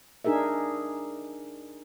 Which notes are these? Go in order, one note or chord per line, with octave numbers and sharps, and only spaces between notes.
D4 D#4 G#4 A#4 E5